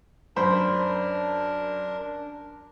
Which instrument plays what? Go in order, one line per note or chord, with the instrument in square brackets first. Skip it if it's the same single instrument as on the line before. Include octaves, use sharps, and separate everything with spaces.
[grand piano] F#2 C5 B5 [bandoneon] D4 A#4